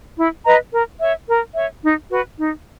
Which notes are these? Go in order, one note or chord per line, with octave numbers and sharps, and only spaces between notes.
E4
B4 D#5 A#5
A#4
C#5 E5
A#4
C#5 E5
D#4
F#4 B4
D#4